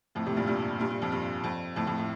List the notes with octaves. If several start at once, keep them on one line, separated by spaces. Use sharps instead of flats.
F2 A2
A2 C3
G2 A#2
G2 A#2
G2 A#2
G2
F2
G2
F2
F2 A2
F2 A2
A2